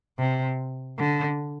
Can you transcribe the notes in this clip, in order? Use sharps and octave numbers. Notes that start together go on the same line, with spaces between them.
C3
D3